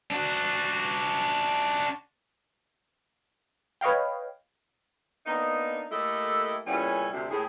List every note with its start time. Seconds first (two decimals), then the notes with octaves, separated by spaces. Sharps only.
0.10 D4 F#4
3.81 B4 C#5 D#5 F5 G5
5.26 A#3 B3 D4 D#4
5.90 A3 A#3 E4 G4 A4 D#5
6.65 A#2 C#3 G3 B3 C#4 E4
7.11 D2 C3
7.30 A2 A#3 G4 G#4